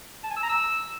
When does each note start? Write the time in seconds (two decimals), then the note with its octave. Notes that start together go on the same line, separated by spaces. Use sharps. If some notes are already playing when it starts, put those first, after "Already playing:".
0.24 A5
0.30 G#5
0.37 E6
0.43 A#5
0.49 E6